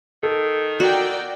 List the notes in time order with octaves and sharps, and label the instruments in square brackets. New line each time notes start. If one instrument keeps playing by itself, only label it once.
[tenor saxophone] D#3 [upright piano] A4
[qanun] F#4 [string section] A#4 D5 G5